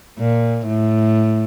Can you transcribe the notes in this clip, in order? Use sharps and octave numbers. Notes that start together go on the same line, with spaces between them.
A#2
A2